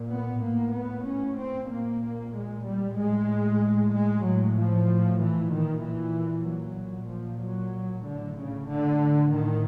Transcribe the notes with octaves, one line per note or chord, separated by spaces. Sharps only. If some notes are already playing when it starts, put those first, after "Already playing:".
Already playing: A#2
B3
A2 A#3
B3
C#4
C4
A#2 A#3
G#3
G3
A2 G#3
G#3
A2 F#3
F3
E3
A#2 D#3
E3
F#3
A#2
F3
F#3
A2 D3
C#3
D3
A2 D#3